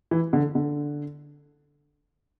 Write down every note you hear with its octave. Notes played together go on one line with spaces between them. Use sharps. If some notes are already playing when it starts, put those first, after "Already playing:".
E3
D3
D3